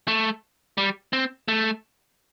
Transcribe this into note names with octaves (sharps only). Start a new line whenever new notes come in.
A3
G3
C4
A3